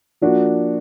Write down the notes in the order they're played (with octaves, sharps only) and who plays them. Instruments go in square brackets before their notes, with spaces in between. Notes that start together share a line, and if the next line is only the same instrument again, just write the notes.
[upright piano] F3 A#3 D4 F#4